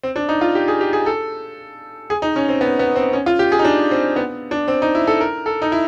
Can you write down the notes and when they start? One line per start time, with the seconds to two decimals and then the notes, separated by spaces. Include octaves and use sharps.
0.03 C4
0.16 D4
0.29 D#4
0.41 F4
0.55 G4
0.68 G#4
0.81 G4
0.93 G#4
1.06 A4
2.10 G#4
2.22 D#4
2.36 C#4
2.49 C4
2.61 B3
2.79 B3
2.96 C4
3.13 C#4
3.26 F4
3.39 G4
3.52 G#4
3.59 D#4
3.64 D4
3.91 C4
4.16 B3
4.51 D4
4.68 C4
4.82 D#4
4.95 E4
5.07 A4
5.21 A#4
5.46 A4
5.62 D#4
5.72 E4